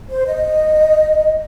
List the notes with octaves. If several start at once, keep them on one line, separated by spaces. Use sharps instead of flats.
C5
D#5